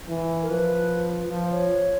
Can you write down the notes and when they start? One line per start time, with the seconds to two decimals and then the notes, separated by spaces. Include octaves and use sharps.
0.08 E3
0.42 A#4
0.49 F3 B4
1.31 F3 C5
1.51 C#5